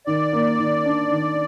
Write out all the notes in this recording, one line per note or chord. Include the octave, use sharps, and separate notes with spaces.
D#3 D5
A#3
D#3
D4
D#3